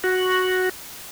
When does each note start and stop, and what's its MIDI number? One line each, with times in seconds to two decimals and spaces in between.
0.04 0.69 66